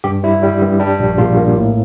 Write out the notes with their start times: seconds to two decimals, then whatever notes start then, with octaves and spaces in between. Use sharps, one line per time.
0.04 G2 G4
0.23 G3 E4
0.43 G3
0.62 G2
0.80 G3 D4
0.99 A#1
1.18 A#1 F4
1.37 A#3
1.56 A2